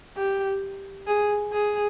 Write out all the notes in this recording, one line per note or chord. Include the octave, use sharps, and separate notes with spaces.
G4
G#4
G#4